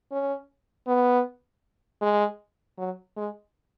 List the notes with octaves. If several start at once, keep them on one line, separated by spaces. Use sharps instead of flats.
C#4
B3
G#3
F#3
G#3